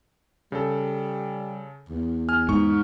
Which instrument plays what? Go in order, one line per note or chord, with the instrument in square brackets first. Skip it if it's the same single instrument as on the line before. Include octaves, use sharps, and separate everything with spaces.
[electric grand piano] C#3 A4 [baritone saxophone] G3
[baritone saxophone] E2
[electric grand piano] G#5 F6
[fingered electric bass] G#2 [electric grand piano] C#6